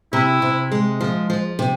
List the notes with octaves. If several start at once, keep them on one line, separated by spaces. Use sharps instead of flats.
C3 E4
C3
G#3
F3
F3
C3